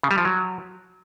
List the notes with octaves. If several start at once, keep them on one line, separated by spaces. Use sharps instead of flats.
C#3
G3
F3
F#3